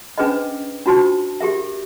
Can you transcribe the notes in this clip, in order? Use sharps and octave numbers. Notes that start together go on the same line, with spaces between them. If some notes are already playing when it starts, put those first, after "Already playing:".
C#4 D4 G#4 B4 C5 D#5
D4 F4 F#4 C5 A5
G4 G#4 A#4 E5